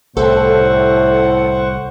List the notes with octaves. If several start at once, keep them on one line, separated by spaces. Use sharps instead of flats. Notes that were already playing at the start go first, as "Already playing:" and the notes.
C2 A2 A4 C5 F#5 C#6